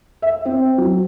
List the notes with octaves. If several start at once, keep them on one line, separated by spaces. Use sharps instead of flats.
E5
C4
F#3